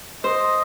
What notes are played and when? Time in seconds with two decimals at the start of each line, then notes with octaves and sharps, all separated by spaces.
0.24 C5 D#5